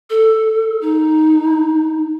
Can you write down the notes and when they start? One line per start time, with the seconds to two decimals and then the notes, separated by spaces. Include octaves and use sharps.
0.10 A4
0.81 D#4